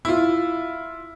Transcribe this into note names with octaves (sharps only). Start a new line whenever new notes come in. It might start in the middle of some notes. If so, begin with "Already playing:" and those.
E4 F4